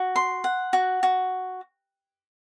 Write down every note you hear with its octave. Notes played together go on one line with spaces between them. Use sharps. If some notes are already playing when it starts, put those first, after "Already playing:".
Already playing: F#4
C6
F#5
F#4
F#4